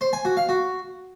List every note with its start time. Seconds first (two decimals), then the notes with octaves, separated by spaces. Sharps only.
0.01 C5
0.13 G#5
0.25 F#4
0.37 F5
0.49 F#4